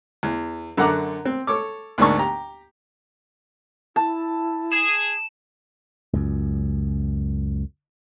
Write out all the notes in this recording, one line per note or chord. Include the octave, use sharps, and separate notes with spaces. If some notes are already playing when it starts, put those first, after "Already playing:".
E2
F#2 D3 A4 F#5 A#5 D6
C4
A4 C#5 D6
D2 G#2 A#3 D4 A5 C#6
G4 A#5
E4 A5
G#4 E7
C#2 F#2